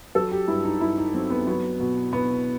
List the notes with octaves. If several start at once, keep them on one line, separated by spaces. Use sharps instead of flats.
F#3 A4
G4
G2 E4
D#4
G2 E4
D#4
F#3 C4
B3
F#3 B3
B2
B2 B3